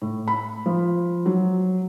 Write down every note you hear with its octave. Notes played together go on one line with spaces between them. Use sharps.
A2
B5
F3
F#3